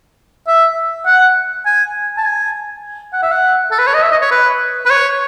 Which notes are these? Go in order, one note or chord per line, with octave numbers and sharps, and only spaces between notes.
E5
F#5
G#5
A5
G#5
F#5
E5
F#5
A4
B4
C#5
D#5
E5
D#5
C#5
B4
B4
C#5